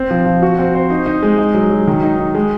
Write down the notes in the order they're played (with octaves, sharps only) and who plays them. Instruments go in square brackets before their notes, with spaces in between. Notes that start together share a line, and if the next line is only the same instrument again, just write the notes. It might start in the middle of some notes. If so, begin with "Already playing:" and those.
Already playing: [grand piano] C4
F3
F3
F#4
C4
C5
D#4
D#4
G#3
D#4
F#3
F#3
D#3
D#4
D#4
G#3